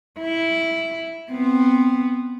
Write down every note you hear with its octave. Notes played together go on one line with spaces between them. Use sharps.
E4
B3 C4